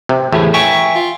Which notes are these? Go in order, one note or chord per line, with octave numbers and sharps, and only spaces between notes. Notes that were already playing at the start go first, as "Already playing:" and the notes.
C3
E2 A2 G4 G#4
E5 G5 G#5 C#6
F4